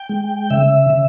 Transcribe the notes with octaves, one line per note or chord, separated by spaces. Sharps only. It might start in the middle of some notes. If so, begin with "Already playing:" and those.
Already playing: G5
G#3
C#3 E5
C#3